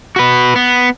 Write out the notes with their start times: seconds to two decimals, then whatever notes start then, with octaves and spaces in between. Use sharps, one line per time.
0.16 F#4 B4
0.56 B3